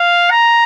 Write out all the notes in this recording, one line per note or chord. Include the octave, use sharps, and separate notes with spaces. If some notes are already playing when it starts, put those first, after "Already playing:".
Already playing: F5
A#5